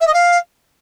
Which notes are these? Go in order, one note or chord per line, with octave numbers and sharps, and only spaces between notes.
E5
D#5
F5